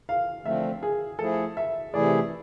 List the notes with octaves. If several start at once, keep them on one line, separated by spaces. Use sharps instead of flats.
F5
D3 F3 A3 C4 E5
G#4
F3 A3 E4 G#4 A4
E5
C3 E3 A3 E4 G#4 D5